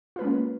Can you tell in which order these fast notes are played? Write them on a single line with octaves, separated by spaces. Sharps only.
F4 B4 G#3 C#4 A#3